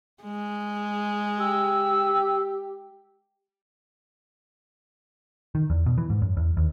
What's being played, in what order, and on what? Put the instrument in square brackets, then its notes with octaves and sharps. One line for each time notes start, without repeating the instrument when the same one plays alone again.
[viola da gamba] G#3
[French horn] G4 [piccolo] E6
[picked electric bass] D#3
E2
B2
E3
G#2
F#2
E2
D#2